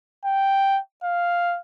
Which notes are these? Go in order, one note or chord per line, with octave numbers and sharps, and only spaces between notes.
G5
F5